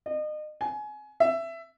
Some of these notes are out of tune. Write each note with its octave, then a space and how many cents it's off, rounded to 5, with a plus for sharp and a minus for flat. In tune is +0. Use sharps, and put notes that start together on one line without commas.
D#5 -35
G#5 +25
E5 +15